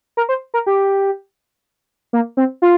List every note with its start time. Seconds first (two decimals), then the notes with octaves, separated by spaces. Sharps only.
0.17 A#4
0.29 C5
0.54 A#4
0.66 G4
2.13 A#3
2.37 C4
2.62 F4